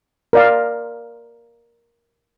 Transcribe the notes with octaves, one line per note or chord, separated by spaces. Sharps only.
A#4 D5 F5